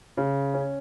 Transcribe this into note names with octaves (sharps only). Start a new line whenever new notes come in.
C#3
C#4